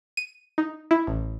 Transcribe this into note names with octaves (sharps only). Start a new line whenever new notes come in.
D#7
D#4
E4
A1